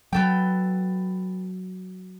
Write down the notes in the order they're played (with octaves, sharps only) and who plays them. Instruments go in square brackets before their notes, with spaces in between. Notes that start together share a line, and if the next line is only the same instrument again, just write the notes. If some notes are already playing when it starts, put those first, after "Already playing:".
[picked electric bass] F#3 [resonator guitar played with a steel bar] B3 A4 G5